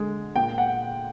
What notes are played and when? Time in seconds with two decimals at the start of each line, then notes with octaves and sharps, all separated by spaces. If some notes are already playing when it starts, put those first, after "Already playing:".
Already playing: D3 G#3
0.36 A#2 G5
0.58 F#5